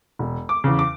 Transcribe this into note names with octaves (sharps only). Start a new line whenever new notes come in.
E1
D6
E2 C#3
D6